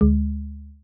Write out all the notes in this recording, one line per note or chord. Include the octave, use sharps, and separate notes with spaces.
D2 G#3